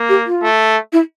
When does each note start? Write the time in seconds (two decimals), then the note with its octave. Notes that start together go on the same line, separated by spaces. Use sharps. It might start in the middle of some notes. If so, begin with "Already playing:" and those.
Already playing: A#3
0.08 G4
0.26 F4
0.42 A3
0.92 E4